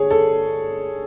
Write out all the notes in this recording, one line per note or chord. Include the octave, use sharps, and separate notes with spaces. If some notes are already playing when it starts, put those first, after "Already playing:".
Already playing: D3 G#4 C#5
A4